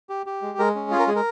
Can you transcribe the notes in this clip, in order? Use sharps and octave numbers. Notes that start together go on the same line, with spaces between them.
G4
G4
G#3
G#3 A#4
C#4
F4 G#4
A#4
G#3 G#4
A#4